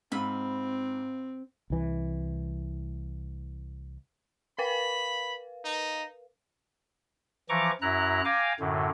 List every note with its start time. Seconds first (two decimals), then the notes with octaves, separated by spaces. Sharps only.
0.12 G#2 C4 F4 B5 E6
1.70 C2 E3
4.59 A#4 B4 F5 B5
5.65 D#4
7.49 E3 F3 A#5 C#6 D6
7.81 F#2 E4 A#5 F#6
8.25 F5 G5 G#5 A#5 D6
8.60 F#2 A2 D3